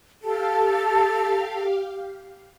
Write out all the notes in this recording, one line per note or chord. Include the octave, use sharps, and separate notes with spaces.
G4 A4 F5